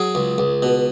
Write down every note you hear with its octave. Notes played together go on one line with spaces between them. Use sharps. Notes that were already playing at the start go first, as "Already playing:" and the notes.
Already playing: F#3 G#4
C#2
C#2
B2